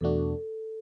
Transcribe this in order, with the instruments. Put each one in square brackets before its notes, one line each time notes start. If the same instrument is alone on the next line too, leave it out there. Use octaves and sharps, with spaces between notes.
[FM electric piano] E2 B2 A3 D4 F#4 [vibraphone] A4